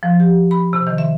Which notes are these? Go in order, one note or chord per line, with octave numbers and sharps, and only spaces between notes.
F3
G4
B5
C3
D#3
E5